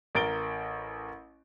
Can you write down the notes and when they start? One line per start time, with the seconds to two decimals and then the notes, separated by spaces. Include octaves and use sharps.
0.15 A1 A#4 A6 D7 G7